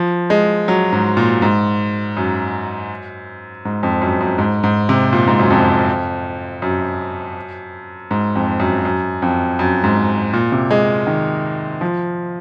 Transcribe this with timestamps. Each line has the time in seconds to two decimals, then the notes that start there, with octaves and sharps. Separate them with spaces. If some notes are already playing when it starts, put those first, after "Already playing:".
Already playing: F3
0.30 G#3
0.68 F#3
0.93 G#2
1.17 A#2
1.42 G#2
2.17 F#2
3.65 G#2
3.83 F2
4.02 F#2
4.21 F#2
4.38 G#2
4.64 G#2
4.89 C3
5.13 A#2
5.27 G#2
5.39 F#2
5.50 F2
6.62 F#2
8.11 G#2
8.35 F2
8.60 F#2
8.85 F#2
9.22 F2
9.59 F#2
9.84 G#2
10.33 A#2
10.52 C3
10.71 G#3
11.07 D#3
11.81 F3